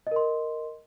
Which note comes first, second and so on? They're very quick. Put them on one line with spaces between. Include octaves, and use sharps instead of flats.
D#5 A#4 C6